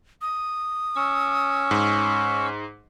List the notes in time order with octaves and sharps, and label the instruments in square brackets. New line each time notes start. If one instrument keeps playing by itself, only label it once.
[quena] D#6
[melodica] C#4 [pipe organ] C#6 E6
[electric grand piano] G#2